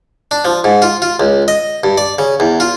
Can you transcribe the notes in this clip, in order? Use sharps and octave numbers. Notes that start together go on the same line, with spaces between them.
D4
F3
G#2
F4
F4
C#2
D#5
G2
D5
C#3
E2
F4